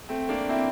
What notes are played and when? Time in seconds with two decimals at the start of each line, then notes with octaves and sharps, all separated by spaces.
0.09 A3 C4
0.29 A#3 D4
0.49 C4 E4